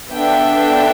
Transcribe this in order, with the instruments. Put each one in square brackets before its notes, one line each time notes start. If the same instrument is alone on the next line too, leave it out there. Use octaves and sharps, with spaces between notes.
[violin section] B3 D4 A4 E5 G5